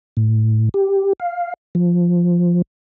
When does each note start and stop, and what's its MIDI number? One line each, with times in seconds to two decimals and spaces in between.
0.17 0.69 45
0.74 1.13 67
1.20 1.54 77
1.75 2.62 53